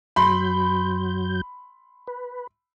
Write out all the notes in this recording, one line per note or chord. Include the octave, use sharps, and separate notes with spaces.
F#2 F#3 B5 C6 G6
B4